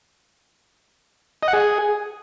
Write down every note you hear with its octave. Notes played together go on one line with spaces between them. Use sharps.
D#5
F#5
G#4